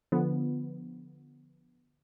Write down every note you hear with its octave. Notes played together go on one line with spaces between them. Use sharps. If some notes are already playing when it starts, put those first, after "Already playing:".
D3 F3 B3